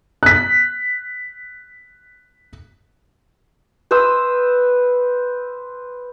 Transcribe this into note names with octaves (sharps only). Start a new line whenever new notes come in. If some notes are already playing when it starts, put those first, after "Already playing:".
F#6 B6
B4 C5 D#6 E6